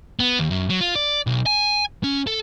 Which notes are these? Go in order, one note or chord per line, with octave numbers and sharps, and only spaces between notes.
B3
D#2
F#2
F#3
F4
D5
B1
G#5
C#4
A4